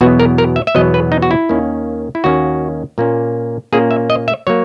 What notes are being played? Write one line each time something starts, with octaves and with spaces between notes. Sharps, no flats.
E2 B2 F#3 B3 F#4
A#4
A#4
E5
E5
E2 B2 F#3 B3 D#5
B4
D#4
F#4
E4
D#2 D#3 A#3 C#4
E4
D#2 D#3 A#3 C#4 F#4
A#2 A#3 C#4
A#2 A#3 C#4 G#4
E5
D#5
E5
F#3 A#3 C#5